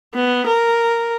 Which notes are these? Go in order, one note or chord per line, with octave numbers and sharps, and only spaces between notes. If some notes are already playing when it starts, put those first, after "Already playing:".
B3
A#4